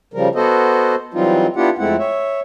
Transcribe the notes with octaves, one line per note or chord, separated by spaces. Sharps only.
C#3 F3 G3 A#4
B3 F#4 A4 C5 D#5
E3 F#3 G3 C4 D#4 F4
B3 D4 E4 F4 G4 F#5
F2 G#3 A3 C4 E4 F#5
C#5 E5